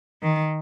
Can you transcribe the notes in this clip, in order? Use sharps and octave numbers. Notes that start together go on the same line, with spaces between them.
D#3